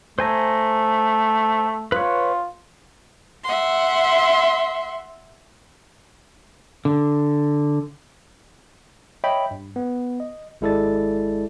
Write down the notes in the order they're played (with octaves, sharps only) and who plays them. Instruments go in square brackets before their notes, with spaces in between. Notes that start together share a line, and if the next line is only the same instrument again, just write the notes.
[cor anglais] A3 [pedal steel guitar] C5 G#5 A#5
[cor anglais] F4 [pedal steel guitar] B4 C#5
[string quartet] E5 F#5 C6
[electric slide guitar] D3
[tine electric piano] C#5 D#5 E5 G5 B5
G2
B3
D#5
G#1 G#3 E4 A4 D5 A6